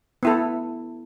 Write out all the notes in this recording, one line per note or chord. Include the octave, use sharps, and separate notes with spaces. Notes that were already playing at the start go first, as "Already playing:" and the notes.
B3 E4 A4